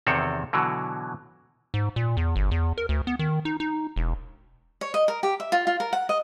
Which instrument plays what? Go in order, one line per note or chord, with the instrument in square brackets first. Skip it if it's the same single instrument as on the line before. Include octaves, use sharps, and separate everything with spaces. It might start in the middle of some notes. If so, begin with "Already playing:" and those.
[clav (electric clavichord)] E2 C3 D#3 C4 A4 C#5
B2 D3 E3 F#3
[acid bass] G#2
A#2
E2
G1
E2
A#4
D2
B3
D#3
D#4
D#4
E1
[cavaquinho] C#5
D#5
A#4
G4
E5
F4
F4
A#4
F#5
D#5